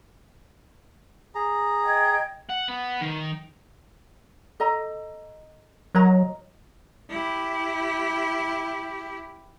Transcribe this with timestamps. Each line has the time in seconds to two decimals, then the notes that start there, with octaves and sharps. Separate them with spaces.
1.35 G#4 A#5
1.84 D#5 G5 G#6
2.49 F#5
2.68 B3
3.01 D#3
4.60 A4 D#5 A#5
5.95 F#3 A#4 D#5 A#5
7.10 E4 G4